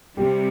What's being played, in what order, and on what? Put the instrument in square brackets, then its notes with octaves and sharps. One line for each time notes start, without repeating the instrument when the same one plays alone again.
[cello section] C3 G3 [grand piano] G4